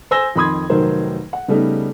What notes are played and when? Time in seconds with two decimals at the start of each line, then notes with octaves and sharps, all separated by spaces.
0.11 C5 G#5 E6 A#6 G7
0.35 F2 D#3 B5 C6 D#6 G#6
0.70 F1 D#3 F#3 A#4 C5
1.33 F#5
1.48 C#3 G3 A3 B3 D#4